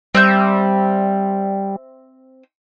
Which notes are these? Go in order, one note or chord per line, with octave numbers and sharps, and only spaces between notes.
G3 C4 E5 G6